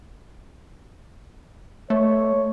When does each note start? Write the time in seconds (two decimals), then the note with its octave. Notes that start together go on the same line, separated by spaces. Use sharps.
1.90 A3 C#5